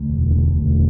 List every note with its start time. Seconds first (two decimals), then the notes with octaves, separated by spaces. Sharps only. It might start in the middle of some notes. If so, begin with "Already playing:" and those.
Already playing: D2
0.09 E1
0.33 D2
0.56 E1